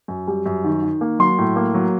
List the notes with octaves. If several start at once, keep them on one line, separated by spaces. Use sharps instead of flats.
F#2
G3
F#2
D#3
D#3
A#3
F#3 C6
A2
A#3
F#3